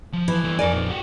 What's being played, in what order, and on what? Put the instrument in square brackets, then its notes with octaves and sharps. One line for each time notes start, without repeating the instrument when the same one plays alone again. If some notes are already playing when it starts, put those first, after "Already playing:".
[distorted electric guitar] F3
[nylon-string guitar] E3
[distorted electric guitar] G3 A4
[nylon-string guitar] F2 A#4 D5 [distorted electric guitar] C5 G#5
[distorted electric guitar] A#2 D#4
F#4 G4